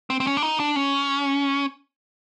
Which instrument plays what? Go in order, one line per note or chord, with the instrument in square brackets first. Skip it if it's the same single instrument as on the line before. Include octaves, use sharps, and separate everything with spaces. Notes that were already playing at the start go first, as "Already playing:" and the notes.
[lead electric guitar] C4
C4
C#4
D4
D#4
D4
C#4